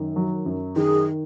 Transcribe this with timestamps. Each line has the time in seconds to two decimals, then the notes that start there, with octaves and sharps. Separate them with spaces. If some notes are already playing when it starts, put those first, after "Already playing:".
Already playing: F#2 D#3
0.16 F#3
0.46 F#2
0.76 D#3 G#4